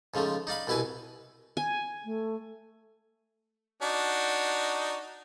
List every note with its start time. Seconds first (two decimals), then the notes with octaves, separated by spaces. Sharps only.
0.14 G#2 C#3 F3 A3
0.47 D#4 D5 F5 B5
0.67 C2 B2 E4 B4 G#5
1.57 G#5
2.05 A3
3.82 D4 D#4 F#4